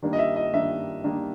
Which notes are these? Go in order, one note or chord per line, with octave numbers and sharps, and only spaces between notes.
D#3 G3 A#3 D4
D#5
E5
D#5
D#3 G3 A#3 D4 E5
D#3 G3 A#3 D4